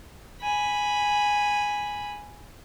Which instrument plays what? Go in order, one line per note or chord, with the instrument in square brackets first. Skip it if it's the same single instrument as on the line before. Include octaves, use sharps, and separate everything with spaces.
[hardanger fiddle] G#5 B5